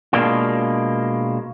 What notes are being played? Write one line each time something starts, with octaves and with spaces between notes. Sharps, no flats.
B2 G#3 A#3 D4 F4